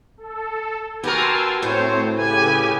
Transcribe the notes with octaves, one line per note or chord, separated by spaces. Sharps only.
A4
B3 F#4 G4 A#4 G#5 A5 C6 E6
A2 A3 C4 C5 C#5
C#3 G4 A4 B4 G#5